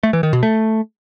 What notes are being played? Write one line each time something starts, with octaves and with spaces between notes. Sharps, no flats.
A3
E3
D#3
B2
A3